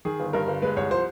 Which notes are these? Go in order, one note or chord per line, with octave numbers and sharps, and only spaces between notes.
D#3 G#4
G1
G2 A#4
G1
G#3 B4
C2 C#5
F3 C5